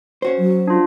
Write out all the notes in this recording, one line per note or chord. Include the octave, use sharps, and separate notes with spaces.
C#4 F#4 C5
F#3
D4 F4